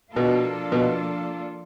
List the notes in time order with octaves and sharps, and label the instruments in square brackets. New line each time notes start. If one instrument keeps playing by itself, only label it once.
[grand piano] B2 [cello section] F3 A#3 D4 F4 A4
[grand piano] B2